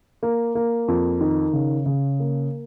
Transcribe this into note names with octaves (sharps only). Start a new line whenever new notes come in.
A#3
A#3
F2
D#3
C#3
C#3
A#3